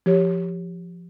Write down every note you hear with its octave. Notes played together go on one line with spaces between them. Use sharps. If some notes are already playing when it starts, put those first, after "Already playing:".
F3 G4 C#5